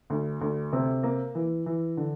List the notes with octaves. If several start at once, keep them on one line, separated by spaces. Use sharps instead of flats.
D2
D2
C3
A#3
E3
E3
D3